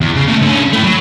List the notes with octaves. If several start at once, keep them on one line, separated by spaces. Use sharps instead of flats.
E2
C#3
A3 A#3
D3 C#4
A3 E4
F#3